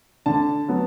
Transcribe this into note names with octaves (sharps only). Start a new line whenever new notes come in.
D3 A5
F#3 B3